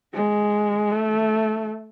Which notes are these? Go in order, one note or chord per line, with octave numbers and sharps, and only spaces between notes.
G#3
A3